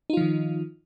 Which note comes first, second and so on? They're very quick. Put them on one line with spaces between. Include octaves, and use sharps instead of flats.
D#4 F4 F3 D#3